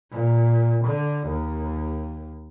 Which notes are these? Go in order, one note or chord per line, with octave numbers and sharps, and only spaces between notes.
A#2
D3
D#2